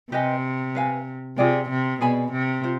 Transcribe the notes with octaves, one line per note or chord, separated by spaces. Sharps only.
C3 G4 B4 D#5 G#5
B4 F5 G#5
C3 F4 G#4 D5 G5
C3
B2 G#4 D5 G#5 B5
C3
F4 C5